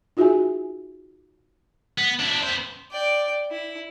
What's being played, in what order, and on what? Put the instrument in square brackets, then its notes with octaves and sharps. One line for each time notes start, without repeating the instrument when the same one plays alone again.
[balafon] D#4 F4 F#4 G#4 E5 G#5
[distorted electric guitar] B3
D4 E4
B3 C5
[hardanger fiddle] D5 G5
E4